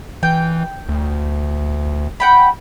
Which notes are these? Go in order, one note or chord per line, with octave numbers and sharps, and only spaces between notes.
E3 G5
D2
F#5 G5 B5